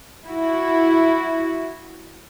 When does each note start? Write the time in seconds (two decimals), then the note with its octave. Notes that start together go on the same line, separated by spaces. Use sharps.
0.24 E4 F#4